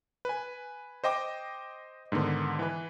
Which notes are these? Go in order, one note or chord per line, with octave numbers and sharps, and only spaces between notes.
B4 G#5
C5 D#5 G5 D6
G#2 D3 D#3 B3
E3 B4